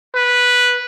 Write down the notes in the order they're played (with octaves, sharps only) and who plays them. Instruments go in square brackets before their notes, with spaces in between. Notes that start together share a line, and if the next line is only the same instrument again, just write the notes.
[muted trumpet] B4